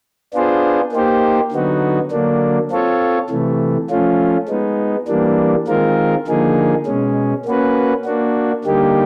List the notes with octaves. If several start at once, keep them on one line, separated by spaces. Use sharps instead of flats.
B3 D4 F4 G#4 C5
A#3 D#4 G4 C5
D3 F#3 B3 D#4 F#4
D3 F#3 A#3 D4
C4 F4 A4 C#5
C3 E3 A3
F3 A3 C#4 F4
G#3 B3 D#4
E3 G3 A#3 D4
D#3 G#3 C4 F4 A#4
D3 F3 A#3 D#4 G#4
B2 G#3 C#4
A#3 C#4 F#4 B4
A#3 D4 F#4
D3 G3 A#3 D#4 G4